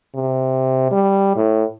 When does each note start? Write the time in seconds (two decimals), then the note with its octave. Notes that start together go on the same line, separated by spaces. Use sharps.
0.15 C3
0.92 G3
1.36 A2